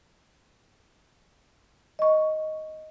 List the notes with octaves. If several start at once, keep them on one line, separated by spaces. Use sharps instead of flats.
D#5 C#6